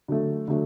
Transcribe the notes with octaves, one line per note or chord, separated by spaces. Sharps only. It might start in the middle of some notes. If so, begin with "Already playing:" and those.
D3 F#3 A3
D3 F#3 A3